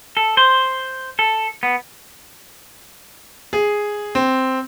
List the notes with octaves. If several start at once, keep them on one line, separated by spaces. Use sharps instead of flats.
A4
C5
A4
B3
G#4
C4